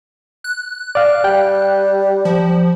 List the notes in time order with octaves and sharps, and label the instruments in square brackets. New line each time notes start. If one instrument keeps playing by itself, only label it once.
[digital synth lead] F#6
[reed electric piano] D5 F5
[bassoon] G3 [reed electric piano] G5
[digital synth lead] F3